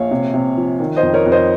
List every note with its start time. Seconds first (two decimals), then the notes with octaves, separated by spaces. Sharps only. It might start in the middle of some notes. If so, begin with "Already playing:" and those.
Already playing: A#1 C#5 F5
0.11 C3
0.34 C3
0.57 F3
0.80 D#3
0.97 C5 D#5
1.03 F2
1.14 A#4 C#5
1.26 F2
1.32 C5 D#5